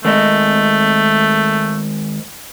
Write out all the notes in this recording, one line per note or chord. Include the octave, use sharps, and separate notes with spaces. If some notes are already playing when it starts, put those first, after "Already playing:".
D#3 G#3 A3 D#5